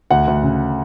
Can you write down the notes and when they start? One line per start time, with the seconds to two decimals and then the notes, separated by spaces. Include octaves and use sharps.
0.10 D2 F#5
0.27 D2
0.43 C#3